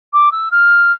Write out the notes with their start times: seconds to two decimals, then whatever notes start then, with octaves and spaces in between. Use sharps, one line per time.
0.13 D6
0.32 E6
0.51 F6